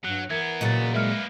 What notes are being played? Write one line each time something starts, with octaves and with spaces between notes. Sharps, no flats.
G2 F#3 F#6
E3 B3 A#4 E5 G#6
A#2 C#3 F#3 D#5 A6
G#3 A#3 B4 E5 F6 C#7